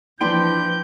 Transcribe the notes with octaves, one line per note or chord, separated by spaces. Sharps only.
E3 F3 D4 B4 G5 C6 G6 D7